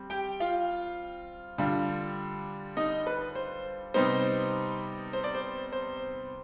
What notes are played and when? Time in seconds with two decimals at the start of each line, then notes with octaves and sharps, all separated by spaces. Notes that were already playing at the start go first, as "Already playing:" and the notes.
Already playing: G3 C4
0.10 G4 G5
0.40 F4 F5
1.58 D3 G3 D4 F4
2.77 D#4 D#5
3.07 B4
3.35 C5
3.94 C3 G3 B3 D#4 C5
5.13 C5
5.24 D5
5.35 C5
5.73 C5